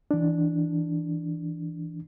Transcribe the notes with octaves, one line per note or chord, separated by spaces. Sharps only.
E3 D4